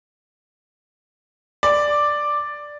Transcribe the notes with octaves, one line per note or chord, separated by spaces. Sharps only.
D5